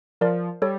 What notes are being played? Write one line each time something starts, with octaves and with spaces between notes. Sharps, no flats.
F3 A#4 D5
G3 A4 C#5